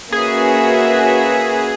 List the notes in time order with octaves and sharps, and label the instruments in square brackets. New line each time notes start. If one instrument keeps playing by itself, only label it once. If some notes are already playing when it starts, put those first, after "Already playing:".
[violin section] A#3 C#4 F#4 B4 E5 [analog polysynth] G#4